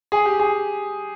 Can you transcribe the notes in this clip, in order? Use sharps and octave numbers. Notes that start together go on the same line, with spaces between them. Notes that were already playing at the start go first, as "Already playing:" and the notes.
G#4
G4
G#4